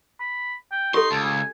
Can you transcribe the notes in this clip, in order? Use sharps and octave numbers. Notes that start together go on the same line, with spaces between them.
B5
G5
D#4 G4 A4 C6
C#2 A5
G#5